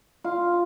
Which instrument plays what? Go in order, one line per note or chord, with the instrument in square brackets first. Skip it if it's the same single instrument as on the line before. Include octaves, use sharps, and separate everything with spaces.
[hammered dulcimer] F4